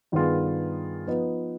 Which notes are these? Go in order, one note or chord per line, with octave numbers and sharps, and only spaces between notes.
G2 D#3 B3 F4 G#4
F3 B3 D#4 B4